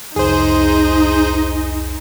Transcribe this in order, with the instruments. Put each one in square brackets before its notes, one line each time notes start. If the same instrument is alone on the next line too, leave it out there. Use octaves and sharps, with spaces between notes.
[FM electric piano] C2 F2 [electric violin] D#4 [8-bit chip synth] G#4 C5